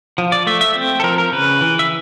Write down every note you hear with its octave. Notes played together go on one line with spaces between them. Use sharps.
F3
D5
A3 E5
E5
C4
A4
F3 A#4
A#4
C#3 B4
E3
E5